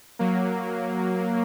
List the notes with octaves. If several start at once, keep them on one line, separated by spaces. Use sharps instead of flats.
F#3 A#3